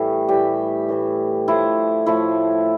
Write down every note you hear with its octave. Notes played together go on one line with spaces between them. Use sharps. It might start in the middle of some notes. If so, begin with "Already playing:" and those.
Already playing: A2 E3 G3
A2 E3 G3 G4
A2 E3 G3
A2 F3 A3 E4
A2 F3 A3 E4